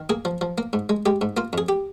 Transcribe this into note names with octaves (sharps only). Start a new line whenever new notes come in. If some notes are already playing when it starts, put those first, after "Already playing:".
Already playing: D#3
A#3 G#4
F3
F3
A#3
G#2
G#3
G#3 G4
G#2
A#3 F4
F2 G#4
G4